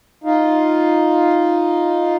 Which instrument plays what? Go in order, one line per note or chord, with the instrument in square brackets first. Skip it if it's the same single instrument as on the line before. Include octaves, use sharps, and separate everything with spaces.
[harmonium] D#4 F4